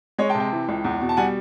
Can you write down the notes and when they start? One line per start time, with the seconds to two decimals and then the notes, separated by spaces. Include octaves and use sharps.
0.18 G#3 C#5 D#5
0.30 G5 A5
0.34 C3
0.40 G5 A5
0.52 E3
0.68 C#2
0.84 E2
1.01 B2
1.09 A5
1.17 G3 F#5 G#5